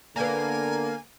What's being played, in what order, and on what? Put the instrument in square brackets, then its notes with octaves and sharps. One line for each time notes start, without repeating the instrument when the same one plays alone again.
[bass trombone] D3 [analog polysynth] A#3 [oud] B3 D4 [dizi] G#5